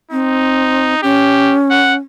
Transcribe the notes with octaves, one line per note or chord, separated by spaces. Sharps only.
C4 D#4
C#4 G4
F#5